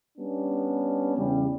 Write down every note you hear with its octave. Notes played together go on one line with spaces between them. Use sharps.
G3 B3 C#4 D4
E2 C#3 G3